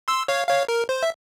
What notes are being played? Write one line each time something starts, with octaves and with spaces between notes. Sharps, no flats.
C6 E6
C#5 F5
C#5 F5
A#4
C5
E5